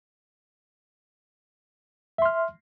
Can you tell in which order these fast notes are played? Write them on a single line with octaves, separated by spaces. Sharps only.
E5 C6 F6